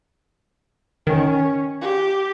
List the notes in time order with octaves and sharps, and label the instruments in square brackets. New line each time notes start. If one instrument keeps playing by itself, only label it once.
[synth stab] D#3 [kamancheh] C#4
[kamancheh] G4